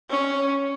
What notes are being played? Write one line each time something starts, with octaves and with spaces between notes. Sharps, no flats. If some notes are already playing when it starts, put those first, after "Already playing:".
C#4